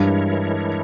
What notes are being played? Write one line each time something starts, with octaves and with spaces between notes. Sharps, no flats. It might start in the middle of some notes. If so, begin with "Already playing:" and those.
Already playing: G2 E3 G#3 E4 A#4 C#5